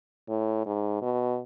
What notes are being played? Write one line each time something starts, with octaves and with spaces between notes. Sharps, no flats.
A2
G#2
B2